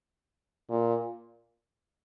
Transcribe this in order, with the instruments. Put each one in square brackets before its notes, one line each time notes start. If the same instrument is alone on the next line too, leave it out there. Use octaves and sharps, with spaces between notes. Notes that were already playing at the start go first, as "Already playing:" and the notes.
[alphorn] A#2